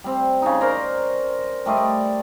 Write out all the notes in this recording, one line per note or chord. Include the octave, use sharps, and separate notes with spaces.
G3 C4
C#3 D#4
A#4 C5 D5 A#5
G3 A3 D#5 C6
D5